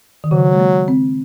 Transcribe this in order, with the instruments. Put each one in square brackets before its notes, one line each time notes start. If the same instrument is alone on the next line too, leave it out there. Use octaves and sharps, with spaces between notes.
[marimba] D#3
[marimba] C#3 [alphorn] F#3
[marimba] G#3
A#3
C4